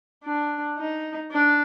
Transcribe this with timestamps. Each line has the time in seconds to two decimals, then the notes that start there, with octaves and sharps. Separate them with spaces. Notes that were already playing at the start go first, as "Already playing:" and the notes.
0.24 D4
0.78 D#4
1.32 D4